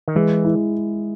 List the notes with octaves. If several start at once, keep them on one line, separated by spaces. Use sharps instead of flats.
D#3
E3 G#3
E4